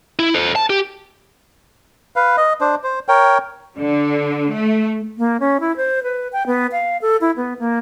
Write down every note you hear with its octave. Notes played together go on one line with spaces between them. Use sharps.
E4
A4 C5
A5
G4
B4 F5
D#5
D4 C5
C5
A#4 C#5 G5
D3
A3
A#3
C#4
E4
C5
B4
G5
B3
F5
A4
E4
B3
A#3